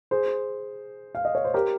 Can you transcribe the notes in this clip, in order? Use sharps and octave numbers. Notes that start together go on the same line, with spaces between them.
G#4 C5
F5
D#5
C#5
C5
G4 A#4